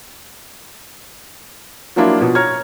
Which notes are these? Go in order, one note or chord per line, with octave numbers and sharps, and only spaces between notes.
F3 F#3 A#3 D4 E4 F4
B2 F3
C#5 A#5 F6 G#6